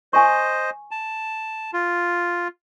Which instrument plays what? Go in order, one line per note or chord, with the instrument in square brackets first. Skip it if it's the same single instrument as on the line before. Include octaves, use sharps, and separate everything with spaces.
[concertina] C5 D#5 [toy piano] G#5 C#6
[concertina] A5
F4